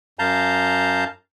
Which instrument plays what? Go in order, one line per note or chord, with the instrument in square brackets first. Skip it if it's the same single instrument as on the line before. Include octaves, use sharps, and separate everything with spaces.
[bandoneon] F#2 F5 A5 A#5 G6